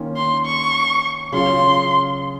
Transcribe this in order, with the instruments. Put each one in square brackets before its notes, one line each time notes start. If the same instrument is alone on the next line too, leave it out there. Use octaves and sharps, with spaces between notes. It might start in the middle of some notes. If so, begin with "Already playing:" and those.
Already playing: [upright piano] D#3 A#3 C#4 F4
[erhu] C6
C#6
[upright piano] C#3 F#3 C#4 F4 [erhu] C6